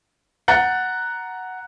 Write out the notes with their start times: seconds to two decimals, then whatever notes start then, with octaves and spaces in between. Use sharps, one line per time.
0.48 F#5 A#5 F#6 G6 A6 C#7